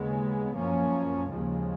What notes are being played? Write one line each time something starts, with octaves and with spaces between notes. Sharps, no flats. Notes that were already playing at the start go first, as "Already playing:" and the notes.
Already playing: D#2 C#3 G#3 B3
F#2 F3 A#3 C#4
D#2 C#3 F3 G#3